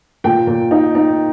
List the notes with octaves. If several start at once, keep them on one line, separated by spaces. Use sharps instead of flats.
A#2 G5
A#2
D#4
D#4